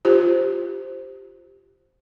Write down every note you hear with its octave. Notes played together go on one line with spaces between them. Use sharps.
F4 G4 C5